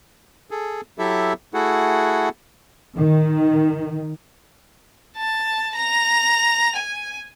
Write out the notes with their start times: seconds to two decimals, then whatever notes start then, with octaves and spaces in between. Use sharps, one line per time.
0.51 G#4 A4
0.98 F#3 E4 G4 A4 E5
1.54 A3 E4 F#4 G#4 A4 F#5
2.95 D#3
5.16 A5
5.76 A#5 F7
6.75 G#5